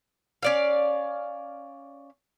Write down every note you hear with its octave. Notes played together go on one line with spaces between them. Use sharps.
C#4 D5 F5